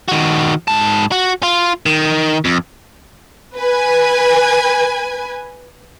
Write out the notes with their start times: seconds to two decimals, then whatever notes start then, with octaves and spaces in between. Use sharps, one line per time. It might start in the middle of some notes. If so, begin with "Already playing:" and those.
0.08 D#3 F#4
0.68 G#2 A5
1.12 F#4
1.43 F4
1.86 D#3
2.45 F2
3.57 B4 G#5